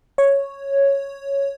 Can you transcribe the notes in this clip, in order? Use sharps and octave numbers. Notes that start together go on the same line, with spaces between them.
C#5